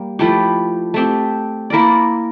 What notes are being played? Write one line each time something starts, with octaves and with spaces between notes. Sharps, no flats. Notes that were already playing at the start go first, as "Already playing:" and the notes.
Already playing: G3 A#3
F3 A3 E4 G4
A3 C4 G4
A#3 E4 A#4 D5